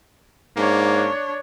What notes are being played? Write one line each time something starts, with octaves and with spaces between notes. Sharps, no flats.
G#2 A#3 D4 C#5